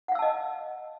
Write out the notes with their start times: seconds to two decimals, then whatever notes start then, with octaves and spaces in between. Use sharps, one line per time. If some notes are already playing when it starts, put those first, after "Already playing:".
0.08 F#5
0.12 F5
0.15 E6
0.19 A5
0.22 D#5